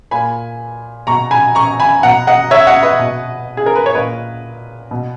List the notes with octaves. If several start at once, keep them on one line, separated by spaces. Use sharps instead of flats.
A#2 G#5 B5
B2 A#5 C#6
G#5 B5
A#5 C#6
G#5 B5
B2 F#5 A#5
D#5 F#5
C#5 E5
D#5 F#5
B4 D#5
B2
G#4
A#4
B4
C#5
A#2 B4 D#5
B2